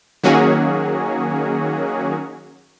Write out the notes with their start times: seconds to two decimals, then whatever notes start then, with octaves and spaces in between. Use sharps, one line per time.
0.23 D#3 F#3 A#3 C#4 F#4 G#4